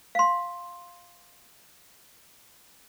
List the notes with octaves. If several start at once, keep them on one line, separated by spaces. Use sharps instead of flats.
F5 C6